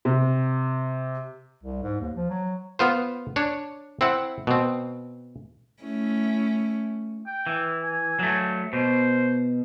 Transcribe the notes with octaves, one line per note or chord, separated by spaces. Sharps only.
C3
C2
G#2
D#2
F3
F#3
B3 F4 C5
D4 C#5
C4 E4 F#5
B2 C4
A3 C#4 E4
G5
E3
G#5
F#3 A3
B2 C5